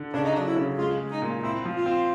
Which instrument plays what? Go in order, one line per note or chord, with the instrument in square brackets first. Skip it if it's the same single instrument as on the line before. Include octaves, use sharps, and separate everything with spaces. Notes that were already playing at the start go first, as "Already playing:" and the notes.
Already playing: [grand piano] D3
[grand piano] C#3 [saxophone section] D4
[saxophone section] D#4
[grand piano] F#3 [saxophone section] D4
[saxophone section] E4
[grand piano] C#3
[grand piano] G#3 [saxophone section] F4
[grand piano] G#3
[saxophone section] D#4
[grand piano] A#2
[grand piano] C4 [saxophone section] E4
[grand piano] F3
[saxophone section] F4
[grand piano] C4